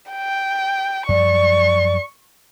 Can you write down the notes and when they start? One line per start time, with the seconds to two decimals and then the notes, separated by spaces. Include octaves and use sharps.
0.11 G5
1.09 F#2 F3 G3 D5 C#6